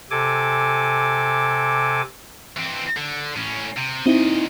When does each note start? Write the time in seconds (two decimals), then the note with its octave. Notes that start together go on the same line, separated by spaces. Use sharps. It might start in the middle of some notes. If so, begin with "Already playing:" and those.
0.11 C3 A4 G#5 D6
2.57 E3 C4
2.97 D3
3.36 A2 C#4
3.77 C3
4.06 A#2 C4 D#4 E4 D#5